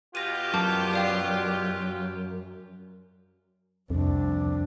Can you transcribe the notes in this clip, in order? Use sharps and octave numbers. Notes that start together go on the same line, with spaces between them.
B2 F4 G4 A#6 D#7
F#2 A5 D6 G6
D5 F5 G5
C2 F2 D4